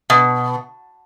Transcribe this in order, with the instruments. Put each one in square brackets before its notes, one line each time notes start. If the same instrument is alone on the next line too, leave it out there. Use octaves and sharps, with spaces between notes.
[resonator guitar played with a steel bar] B2